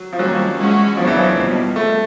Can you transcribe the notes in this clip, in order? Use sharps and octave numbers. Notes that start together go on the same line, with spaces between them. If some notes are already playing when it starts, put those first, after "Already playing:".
Already playing: F#3
F3
D#3 F#3 G3 A#3 C#4
E3 G#3 C#4 F#4
D#2 C#3 F3 F#3 B3 D4
E3
F3
B2 G3 A#3
A3